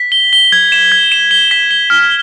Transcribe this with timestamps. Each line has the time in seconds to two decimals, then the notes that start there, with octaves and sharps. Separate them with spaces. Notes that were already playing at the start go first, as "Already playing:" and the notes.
Already playing: B6
0.12 G7
0.33 G7
0.52 G#6
0.72 E7
0.92 G#6
1.12 E7
1.31 G7
1.51 B6
1.71 G7
1.90 F6